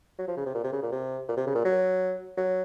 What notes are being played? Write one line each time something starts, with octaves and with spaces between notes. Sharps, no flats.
F#3
F3
C#3
C3
A#2
C3
C#3
A#2
C3
A#2
C3
C#3
A#2
F#3
F#3